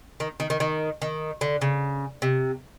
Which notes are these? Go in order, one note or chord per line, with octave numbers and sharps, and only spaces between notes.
D#3
D#3
D#3
D#3
D#3
D3
C#3
C3